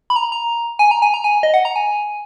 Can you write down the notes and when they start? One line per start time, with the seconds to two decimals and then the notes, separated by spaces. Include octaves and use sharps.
0.10 B5
0.16 A#5
0.32 A#5
0.79 G#5
0.91 A#5
1.02 G#5
1.14 A#5
1.24 G#5
1.43 D#5
1.54 F#5
1.65 A#5
1.76 G#5